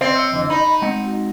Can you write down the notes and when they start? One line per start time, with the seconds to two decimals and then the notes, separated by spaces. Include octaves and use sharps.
0.01 C4 C5 D5 D#5
0.15 C5 C#5 E5
0.31 F2 D3 E3
0.50 D#4 B5
0.82 G#3 C4 F#5
1.06 F#4